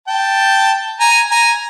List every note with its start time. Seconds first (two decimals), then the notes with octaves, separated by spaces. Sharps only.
0.08 G5 A5
1.00 G#5 A#5
1.31 G#5 A#5